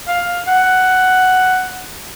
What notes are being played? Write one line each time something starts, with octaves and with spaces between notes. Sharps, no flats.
F5
F#5